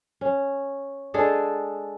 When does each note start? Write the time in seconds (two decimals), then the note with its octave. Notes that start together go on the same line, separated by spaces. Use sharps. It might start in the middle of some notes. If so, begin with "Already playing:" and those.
0.21 C#4
1.14 G#3 D4 G#4 A4